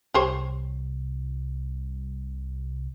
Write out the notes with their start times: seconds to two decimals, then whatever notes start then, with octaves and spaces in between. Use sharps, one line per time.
0.14 C2 G4 C5 C#5